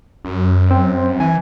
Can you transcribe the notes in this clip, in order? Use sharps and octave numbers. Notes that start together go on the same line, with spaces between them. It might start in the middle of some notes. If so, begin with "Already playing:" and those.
F#2
C4
E3 G#5